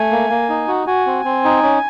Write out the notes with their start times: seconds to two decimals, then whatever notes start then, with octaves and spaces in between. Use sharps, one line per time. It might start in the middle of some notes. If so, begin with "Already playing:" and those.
Already playing: A3 G#5
0.11 A#3
0.30 A#3
0.49 D#4
0.68 F#4
0.87 F#4 G#5
1.06 C4
1.25 C4
1.45 D#4
1.63 C#4